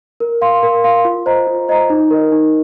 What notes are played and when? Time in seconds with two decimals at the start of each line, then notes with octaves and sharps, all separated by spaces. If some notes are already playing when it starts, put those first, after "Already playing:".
0.20 A#4
0.41 F5 C6
0.63 A#4
0.84 F5 C6
1.05 F4
1.26 C5 D#5 A#5
1.47 F4
1.68 C5 D#5 A#5
1.90 D#4
2.10 A#4 D#5
2.32 D#4